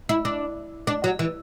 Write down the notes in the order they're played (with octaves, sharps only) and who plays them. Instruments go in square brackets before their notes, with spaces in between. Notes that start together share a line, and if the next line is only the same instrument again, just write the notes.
[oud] E4
D4
D4
F#3
E3